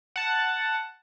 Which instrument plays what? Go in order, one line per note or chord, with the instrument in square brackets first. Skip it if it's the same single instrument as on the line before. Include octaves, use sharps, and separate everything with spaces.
[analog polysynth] F#5 A5